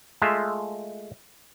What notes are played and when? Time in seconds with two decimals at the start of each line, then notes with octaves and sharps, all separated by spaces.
0.22 G#3 A3 F4 E5